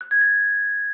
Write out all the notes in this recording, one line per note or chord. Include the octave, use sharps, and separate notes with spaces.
F#6
G#6
A6